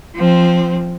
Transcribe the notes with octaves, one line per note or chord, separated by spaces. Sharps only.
F3 C4